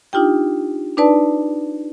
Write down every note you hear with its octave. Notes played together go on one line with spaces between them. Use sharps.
D4 D#4 F4 G4 G5
D4 D#4 B4 D5 A5